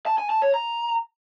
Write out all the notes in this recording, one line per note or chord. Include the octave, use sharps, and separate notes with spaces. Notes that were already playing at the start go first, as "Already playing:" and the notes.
A5
G#5
A5
C#5
A#5